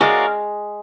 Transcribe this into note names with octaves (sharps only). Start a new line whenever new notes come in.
G#3 C#4 F#4 A#4 D5 F5